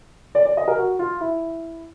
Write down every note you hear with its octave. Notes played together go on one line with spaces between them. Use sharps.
D5
D5
D#5
A#4
F#4
F4
E4